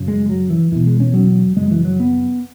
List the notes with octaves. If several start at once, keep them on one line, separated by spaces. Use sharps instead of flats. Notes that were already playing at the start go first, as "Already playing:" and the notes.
Already playing: F#2 C#3
G#3
F#3
E3
E2 B2 E3
G#3
C#4
F#3
F#2 C#3 G#3
E3
F#3
B3